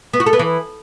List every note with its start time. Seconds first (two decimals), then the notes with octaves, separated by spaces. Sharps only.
0.13 B3
0.20 F#4
0.26 A4
0.33 B3
0.39 E3